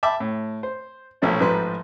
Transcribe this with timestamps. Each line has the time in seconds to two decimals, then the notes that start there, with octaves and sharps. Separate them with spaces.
0.03 E5 G5 A5 B5 D6
0.20 A2
0.63 C5
1.22 B1 A#2 F3 A3 C#4 D4
1.40 A1 G#2 F3 A3 B4 C6